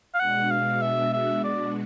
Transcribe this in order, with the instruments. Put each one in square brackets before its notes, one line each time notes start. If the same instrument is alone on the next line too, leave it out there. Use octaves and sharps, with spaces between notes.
[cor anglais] F5
[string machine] B2 G#3 B3 D4 F#4 [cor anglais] F#5
[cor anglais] F5
E5
E5
D5